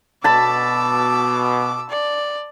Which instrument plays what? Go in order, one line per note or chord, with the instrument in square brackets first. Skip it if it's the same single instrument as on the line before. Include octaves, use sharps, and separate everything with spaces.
[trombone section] B2 [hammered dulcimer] A5 B5 [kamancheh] D6 E6
[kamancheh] D5